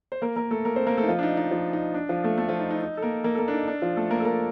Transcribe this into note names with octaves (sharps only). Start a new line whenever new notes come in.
C5
A#3 A#4
A#3 A#4
A3 A4
A#3 A#4
C4 C5
A#3 A#4
A3 A4
D#4
F3 F4
D4
D#4
D#4
F3 F4
D#4
D4
F3 F4
A3 A4
A3 A4
F3 F4
D#4
D#4
D#4
A4
A#3 A#4
A#3 A#4
A4
A#3 A#4
D4
D#4
D4
F3 F4
A3 A4
A#3 A#4
A4
A#3 A#4